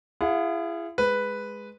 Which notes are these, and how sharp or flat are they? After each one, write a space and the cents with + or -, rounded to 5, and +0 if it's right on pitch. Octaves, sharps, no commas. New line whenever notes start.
E4 +35 G#4 -15 F#5 -45
G#3 +0 B4 +0